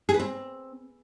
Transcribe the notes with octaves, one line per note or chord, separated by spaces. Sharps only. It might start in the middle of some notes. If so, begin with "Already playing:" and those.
G#4
B4
C4